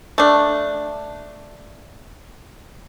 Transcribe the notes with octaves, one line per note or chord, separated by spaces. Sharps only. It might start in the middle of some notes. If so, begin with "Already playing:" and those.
A3 D4